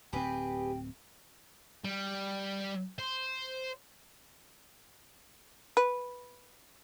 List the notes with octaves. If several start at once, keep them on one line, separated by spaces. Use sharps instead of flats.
D1 C4 G4 G#4 B4 G5
G3
C5
B4